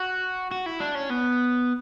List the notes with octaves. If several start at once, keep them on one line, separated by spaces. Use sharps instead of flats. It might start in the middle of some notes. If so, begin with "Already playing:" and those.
Already playing: F#4
F#4
E4
D4
C#4
B3